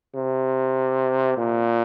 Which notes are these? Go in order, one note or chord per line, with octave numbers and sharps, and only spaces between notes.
C3
A#2